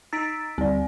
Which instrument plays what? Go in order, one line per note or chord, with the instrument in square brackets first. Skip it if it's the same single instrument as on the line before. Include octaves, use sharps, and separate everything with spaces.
[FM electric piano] D#4 A#5 E6 [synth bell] A6 B6 D7
[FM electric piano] D2 G3 [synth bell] C4 D5